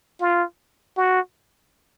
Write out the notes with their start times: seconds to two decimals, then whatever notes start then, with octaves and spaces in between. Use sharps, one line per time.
0.21 F4
0.97 F#4